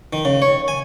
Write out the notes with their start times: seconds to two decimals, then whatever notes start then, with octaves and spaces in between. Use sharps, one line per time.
0.13 D#3
0.25 C#3
0.42 C#5
0.68 G#5